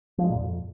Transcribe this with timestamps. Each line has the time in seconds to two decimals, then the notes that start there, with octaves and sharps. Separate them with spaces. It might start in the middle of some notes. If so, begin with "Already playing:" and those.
0.18 F3
0.24 G#3
0.30 A#2
0.36 F#2
0.42 F2